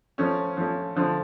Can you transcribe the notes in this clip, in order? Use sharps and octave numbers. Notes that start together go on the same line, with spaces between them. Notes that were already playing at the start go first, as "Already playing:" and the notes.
F3 A3 C#4
F3 A3 C#4
D3 F3 A3